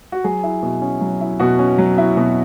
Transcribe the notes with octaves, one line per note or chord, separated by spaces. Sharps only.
F#4
F#3 G#4
E4
B2
C#4
F#3
E4
B2 F#4
C#4
F#3
E4
B2